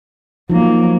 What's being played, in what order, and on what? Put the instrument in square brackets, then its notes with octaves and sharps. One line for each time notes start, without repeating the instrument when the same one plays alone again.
[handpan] F3 D#4 [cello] F#3 A#3